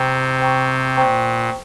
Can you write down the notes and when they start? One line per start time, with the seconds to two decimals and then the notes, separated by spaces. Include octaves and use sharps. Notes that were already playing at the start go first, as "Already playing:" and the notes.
Already playing: C3 C5 G5 A#5 C#6
0.40 C5 G5 A#5 C#6
0.96 A#2 C5 G5 A#5 C#6